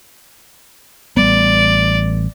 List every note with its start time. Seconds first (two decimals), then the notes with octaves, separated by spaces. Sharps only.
1.17 A1 G3 B3 D5